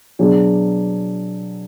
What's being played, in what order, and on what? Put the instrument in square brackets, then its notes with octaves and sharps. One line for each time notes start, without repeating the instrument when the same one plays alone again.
[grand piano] B2 F#3 D4 G#4